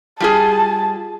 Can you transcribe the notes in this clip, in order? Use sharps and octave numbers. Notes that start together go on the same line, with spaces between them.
G3 F4 G#4 A5